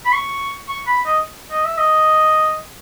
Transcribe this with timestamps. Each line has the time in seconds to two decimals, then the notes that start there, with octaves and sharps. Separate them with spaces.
0.06 B5
0.12 C#6
0.68 C#6
0.87 B5
1.06 D#5
1.51 D#5
1.65 E5
1.78 D#5